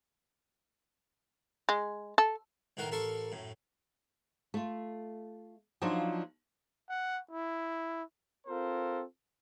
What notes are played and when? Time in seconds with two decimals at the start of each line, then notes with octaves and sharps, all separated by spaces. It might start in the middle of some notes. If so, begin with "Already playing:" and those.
1.69 G#3
2.18 A4
2.77 B1 A2 D#3 F#4 A#4 C6
2.92 A1 A4 A#4 A5 C6 C#6
3.32 F#2 A2
4.54 A3 F4
5.81 F3 F#3 A#3 D4 D#4 F4
6.89 F#5
7.31 E4
8.47 C4 F4 A4 A#4 C5